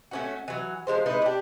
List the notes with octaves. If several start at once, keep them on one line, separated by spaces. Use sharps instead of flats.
A3 C#4 F#4
E3 F#3
F3 F#3 G#3 C5
G#3 D#4 E4 B4
D4 G4